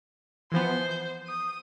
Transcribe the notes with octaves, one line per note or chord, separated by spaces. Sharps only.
E3 F3 B3 C5
G6
D#6